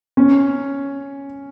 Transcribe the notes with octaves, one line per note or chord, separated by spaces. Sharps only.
C#4